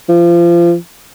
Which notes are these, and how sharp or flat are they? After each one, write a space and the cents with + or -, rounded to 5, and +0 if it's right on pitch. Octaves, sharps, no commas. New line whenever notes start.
F3 -30